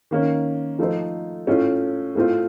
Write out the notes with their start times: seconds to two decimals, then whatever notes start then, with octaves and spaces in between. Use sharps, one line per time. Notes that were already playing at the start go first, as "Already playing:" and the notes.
0.11 D#3 A#3 C#4
0.79 F3 A3 D#4 A4 C5
1.47 A2 A3 C#4 F4
2.15 A2 A3 C4 F4